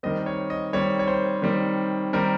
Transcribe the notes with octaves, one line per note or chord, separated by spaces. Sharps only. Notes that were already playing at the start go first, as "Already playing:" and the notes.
D#3 G3 C4 D#5
C#5
D#5
D#3 G3 C4 C#5
C#5
C5
D#3 G3 C4
D#3 G3 C4 A#4